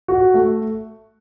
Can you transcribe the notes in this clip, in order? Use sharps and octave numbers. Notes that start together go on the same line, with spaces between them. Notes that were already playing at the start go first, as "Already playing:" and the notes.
F#4
A3